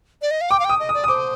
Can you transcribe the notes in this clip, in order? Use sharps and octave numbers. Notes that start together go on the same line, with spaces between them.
D5
D#5
F5
G5 D6
F5
G5 D#6
D#5
D#6
D5
D#6
C5 D6